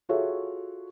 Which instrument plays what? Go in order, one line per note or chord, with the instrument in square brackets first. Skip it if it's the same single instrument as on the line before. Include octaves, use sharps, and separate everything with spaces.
[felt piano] F4 F#4 G#4 A4 C#5 E5